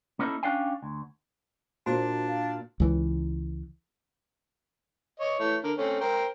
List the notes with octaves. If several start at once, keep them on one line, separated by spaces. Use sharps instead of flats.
A#3 B3 C#4 D#4 E4 A4
C#4 D4 D5 F5 G5 G#5
D2
A#2 A#3 D4 F#4 C5
F5
C#2 E3
C#5 D#5
E3 A3 C#5
D3 A#4
A3 C4 C#4
A#4 C5 G5